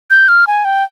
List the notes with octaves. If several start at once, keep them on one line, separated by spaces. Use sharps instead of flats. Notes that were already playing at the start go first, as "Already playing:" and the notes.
G6
F6
G#5
G5